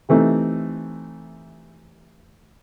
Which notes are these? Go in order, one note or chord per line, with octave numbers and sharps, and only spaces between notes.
C3 E3 A3 C4 D#4